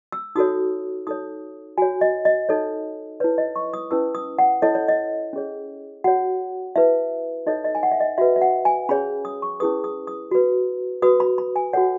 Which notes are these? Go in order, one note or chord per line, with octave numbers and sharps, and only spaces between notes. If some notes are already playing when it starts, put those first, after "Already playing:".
E6
D#4 F#4 A4 C#5 D#6
D#4 A4 C#5 D#6
F#4 C#5 G#5
D#5
D#5
D#4 A4 C#5
E4 B4 C#5
D#5
C#6
D#6
C#4 E4 B4 E6
D#6
F#5
E4 A4 C#5 D#5
C#5
D#5
C#4 G#4 C#5
F#4 C#5 F#5
E4 B4 E5
D#4 A4 C#5 D#5
D#5
G#5
F#5
E5
D#5
F#4 B4 E5
E5
F#5
G#5
C#4 G#4 C#5 B5
D#6
C#6
C#4 E4 G#4 B4 D#6
D#6
D#6
F#4 B4
F#4 B4 D#6
B5
B5
G#5
F#4 A4 C#5 F#5